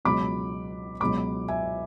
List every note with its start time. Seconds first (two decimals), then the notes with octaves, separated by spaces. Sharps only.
0.05 C#2 B2 F#3 B5 D6
1.00 C#2 B2 F#3 B5 D6
1.48 E5 G#5